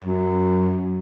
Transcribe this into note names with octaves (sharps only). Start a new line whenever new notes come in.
F#2